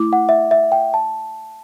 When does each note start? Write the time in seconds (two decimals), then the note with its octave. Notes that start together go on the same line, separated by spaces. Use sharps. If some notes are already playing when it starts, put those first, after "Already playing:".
Already playing: A3 E4 D6
0.13 F#5
0.29 E5
0.51 E5
0.72 G5
0.94 A5